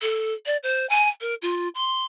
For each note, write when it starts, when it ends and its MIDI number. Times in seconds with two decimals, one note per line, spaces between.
0.02 0.33 69
0.46 0.57 74
0.63 0.88 72
0.89 1.09 80
1.21 1.34 70
1.42 1.68 65
1.75 2.05 84